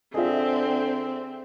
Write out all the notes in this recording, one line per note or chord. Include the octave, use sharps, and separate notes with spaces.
D3 C4 F4 G#4 D#5 E5